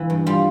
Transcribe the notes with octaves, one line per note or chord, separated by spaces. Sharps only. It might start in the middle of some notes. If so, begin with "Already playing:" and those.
Already playing: E3 A#3 E4
G2
G3 F4